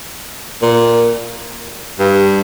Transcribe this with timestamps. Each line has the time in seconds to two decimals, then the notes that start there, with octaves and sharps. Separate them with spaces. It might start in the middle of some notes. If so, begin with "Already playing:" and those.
0.62 A#2
1.99 G2